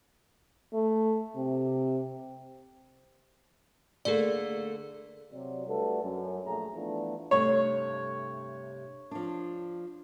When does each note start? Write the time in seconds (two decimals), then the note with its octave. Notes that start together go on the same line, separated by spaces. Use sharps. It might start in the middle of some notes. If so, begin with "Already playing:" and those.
0.73 A3
1.36 C3
4.05 D3 A3 A#3 G#4 D5
5.31 C3 F#3 D5
5.67 G3 A3 D4 F#4 A4 B4
6.03 F#2
6.45 A#1 A3 G#4 A#5
6.75 E3 F3 A3 B3 D4
7.31 G2 C3 A3 C#5
9.11 F3 D4